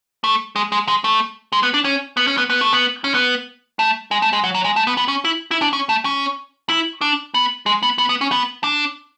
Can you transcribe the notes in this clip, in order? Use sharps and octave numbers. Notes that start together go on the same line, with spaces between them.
A3
G#3
G#3
G#3
A3
G#3
B3
D4
C#4
B3
C#4
B3
B3
A3
B3
C#4
B3
A3
G#3
A3
G#3
F#3
F#3
G#3
A3
B3
B3
C#4
E4
E4
D4
C#4
A3
C#4
E4
D4
B3
G#3
B3
B3
B3
C#4
B3
D4